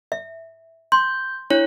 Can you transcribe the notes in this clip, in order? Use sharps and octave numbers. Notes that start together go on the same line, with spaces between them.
E5
C6 G6
D4 E4 C#5